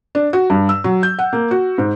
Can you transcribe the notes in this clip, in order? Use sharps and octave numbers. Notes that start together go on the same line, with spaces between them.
D4
F#4
G2
E6
F#3
G6
F#5
A#3
F#4
G#2